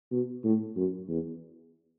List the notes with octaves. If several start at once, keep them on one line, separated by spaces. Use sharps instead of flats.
B2
A2
F#2
E2